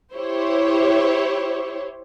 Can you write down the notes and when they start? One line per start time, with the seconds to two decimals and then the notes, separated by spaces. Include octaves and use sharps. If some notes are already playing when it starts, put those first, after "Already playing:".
0.14 E4 G4 C5 C#5